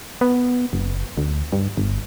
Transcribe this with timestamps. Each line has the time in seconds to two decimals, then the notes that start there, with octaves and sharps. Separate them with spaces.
0.21 B3
0.73 F#1
1.17 D2
1.52 G2
1.77 G1